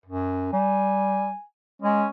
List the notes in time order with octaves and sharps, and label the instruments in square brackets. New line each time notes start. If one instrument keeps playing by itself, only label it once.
[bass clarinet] F#2
[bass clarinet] G3 [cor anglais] G#5
[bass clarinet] G#3 [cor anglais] C#4